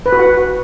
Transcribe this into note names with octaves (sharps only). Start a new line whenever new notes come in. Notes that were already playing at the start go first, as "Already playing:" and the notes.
B4
F#4
F#5